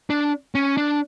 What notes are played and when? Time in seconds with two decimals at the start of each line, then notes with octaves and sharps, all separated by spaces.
0.10 D4
0.55 C#4
0.77 D4